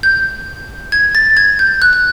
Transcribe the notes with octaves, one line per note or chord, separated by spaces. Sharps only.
G6
G#6
A6
G#6
G6
F#6
F#6